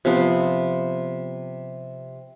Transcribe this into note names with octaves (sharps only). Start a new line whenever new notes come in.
C3 F3 B3